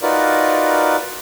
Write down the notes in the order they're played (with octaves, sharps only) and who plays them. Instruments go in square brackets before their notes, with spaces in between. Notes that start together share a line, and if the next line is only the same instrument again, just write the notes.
[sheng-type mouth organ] D#4 F4 F#4 A#4 B4 D5